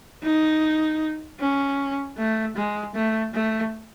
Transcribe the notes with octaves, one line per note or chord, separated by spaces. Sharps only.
D#4
C#4
A3
G#3
A3
A3